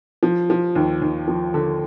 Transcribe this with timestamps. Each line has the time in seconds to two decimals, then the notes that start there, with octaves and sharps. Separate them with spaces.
0.23 F3
0.50 F3
0.75 D#2
1.02 D#2
1.28 F3
1.54 D3